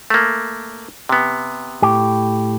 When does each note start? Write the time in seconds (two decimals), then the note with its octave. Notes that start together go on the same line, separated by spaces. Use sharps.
0.10 A3 A#3
1.09 C3 B3
1.82 A2 G4